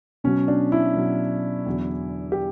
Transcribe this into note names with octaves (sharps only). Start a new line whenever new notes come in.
B2 F#3 C#4
D4
E4
B2 F#3
E2 D3 F#3
G4